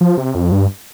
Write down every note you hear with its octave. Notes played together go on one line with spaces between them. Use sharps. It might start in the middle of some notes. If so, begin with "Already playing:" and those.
F3
C3
F2
G2